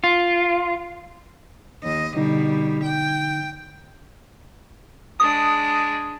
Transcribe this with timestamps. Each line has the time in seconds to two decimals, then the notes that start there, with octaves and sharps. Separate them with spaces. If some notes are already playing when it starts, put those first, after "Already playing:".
0.04 F4
1.84 D#2 D#5
2.17 B2 D3 G3 D#4
2.85 G5
5.20 G#3 D4 D#6